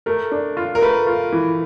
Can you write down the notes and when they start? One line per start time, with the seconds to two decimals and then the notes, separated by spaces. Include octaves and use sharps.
0.06 A3 A#4
0.32 D4
0.57 F4
0.75 A#4
0.81 A3 B4
1.07 F4
1.32 E3